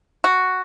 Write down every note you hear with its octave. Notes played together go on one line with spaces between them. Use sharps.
F#4